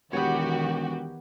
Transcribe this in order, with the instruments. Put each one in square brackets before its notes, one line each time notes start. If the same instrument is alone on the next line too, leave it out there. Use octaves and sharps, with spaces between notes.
[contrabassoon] E1 [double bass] D#3 E3 [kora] B3 C#5 [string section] F#4 G4